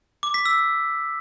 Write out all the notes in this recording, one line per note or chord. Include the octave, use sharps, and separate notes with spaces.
D6
B6
E6